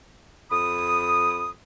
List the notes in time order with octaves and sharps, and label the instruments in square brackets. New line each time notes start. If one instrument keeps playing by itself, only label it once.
[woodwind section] F2 B5 D#6